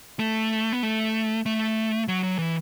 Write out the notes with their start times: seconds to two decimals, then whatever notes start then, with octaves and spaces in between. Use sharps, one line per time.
0.19 A3
0.73 B3
0.83 A3
1.46 A3
2.08 F#3
2.23 F#3
2.39 E3